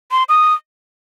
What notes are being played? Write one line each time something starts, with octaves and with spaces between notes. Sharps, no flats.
C6
D#6